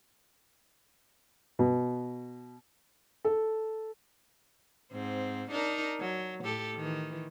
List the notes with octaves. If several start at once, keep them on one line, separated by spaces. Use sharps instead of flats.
B2
A4
G#2 C4
D4 D#4 A#4
F#3
A2 G4 A4
D#3 E3